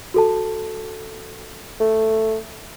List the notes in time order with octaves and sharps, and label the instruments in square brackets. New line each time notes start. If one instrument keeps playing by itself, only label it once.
[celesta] F#4 A4 A5
[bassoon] A3